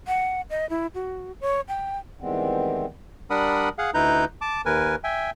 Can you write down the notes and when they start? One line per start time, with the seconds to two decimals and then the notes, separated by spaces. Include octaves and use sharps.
0.07 F#5
0.50 D#5
0.70 E4
0.95 F#4
1.41 C#5
1.68 G5
2.21 D#3 E3 G3 G#3 B3 C4
3.30 G3 D4 A#4 F#5 B5 D#6
3.78 G#4 F5 F#5
3.94 D2 D#4 E4 B4 A#5 G6
4.41 A5 D6
4.66 D#2 A#4 B4 G#5
5.04 E5 G5 G#5